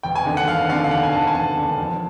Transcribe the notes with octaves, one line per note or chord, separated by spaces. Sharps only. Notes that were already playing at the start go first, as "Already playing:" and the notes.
E1 G5
G#5
D#2 D3
F#5
E1 F5
D#2 D3 F5
F5
E1 F#5
G#5
D#2 D3 A5
G#5
E1 A5
D#2 D3
F2